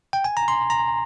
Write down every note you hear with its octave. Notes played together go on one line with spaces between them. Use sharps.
G5
G#5
A#5
C6
A#5